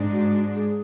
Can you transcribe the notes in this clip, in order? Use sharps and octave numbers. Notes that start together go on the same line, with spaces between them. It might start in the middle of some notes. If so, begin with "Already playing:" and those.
Already playing: G#2 G#3 D4
F#4
G#4